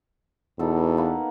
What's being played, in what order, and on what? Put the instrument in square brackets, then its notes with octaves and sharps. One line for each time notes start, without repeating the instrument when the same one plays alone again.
[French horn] E2 [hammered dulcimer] B2 D#4 A4
[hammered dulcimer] A#3 B3 F5